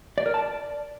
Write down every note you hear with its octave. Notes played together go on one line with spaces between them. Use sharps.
D5
A#4
A5
D5